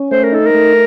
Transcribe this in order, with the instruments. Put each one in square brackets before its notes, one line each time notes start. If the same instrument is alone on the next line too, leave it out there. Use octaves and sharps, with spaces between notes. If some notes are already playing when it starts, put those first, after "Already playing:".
Already playing: [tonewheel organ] C#4
[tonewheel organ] A3 [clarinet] C5
[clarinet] A#4
[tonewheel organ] D#4 [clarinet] A4
[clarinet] A#4
[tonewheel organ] A3